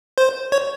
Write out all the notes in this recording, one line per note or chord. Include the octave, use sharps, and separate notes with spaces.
C5
C#5